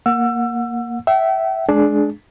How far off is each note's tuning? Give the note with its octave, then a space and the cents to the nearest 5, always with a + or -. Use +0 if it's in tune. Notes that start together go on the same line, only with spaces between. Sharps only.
A#3 +0 F#5 -25 E6 +25
E5 +0 G5 -40
G#3 +25 D4 +0 G#4 +25